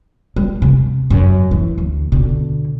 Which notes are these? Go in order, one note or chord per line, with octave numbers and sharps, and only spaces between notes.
G3
C3
F#2
E3
D2
B2 D3